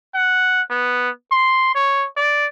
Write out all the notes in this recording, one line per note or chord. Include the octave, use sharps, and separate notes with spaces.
F#5
B3
C6
C#5
D5